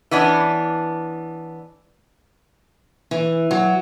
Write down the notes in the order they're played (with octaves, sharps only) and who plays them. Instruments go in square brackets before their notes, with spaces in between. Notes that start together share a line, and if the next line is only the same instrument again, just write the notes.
[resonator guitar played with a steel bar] E3 B3 C#4 D4
[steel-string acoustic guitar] E3
F#3